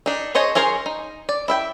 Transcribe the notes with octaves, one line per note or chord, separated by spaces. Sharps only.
D4 D#4
G#4 C5 C#5 D#5 A5
C#4 G#4 A#4 C5 C#5
D#4
D5
E4 E5 G5